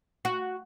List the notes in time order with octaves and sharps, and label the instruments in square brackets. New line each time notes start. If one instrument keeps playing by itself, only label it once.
[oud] F#4